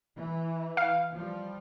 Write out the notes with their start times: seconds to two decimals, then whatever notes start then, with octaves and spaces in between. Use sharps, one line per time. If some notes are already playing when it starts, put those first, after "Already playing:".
0.17 E3
0.77 F5
1.14 F3 G3